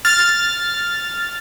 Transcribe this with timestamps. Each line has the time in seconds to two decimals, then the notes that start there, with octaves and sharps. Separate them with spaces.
0.05 F6 A6